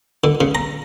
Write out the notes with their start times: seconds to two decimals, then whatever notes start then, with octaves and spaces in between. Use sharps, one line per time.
0.24 D3
0.41 C#3
0.55 A#5